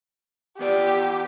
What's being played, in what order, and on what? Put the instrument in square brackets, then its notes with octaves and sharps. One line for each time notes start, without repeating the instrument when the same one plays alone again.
[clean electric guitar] E2 B3 D5 [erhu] G4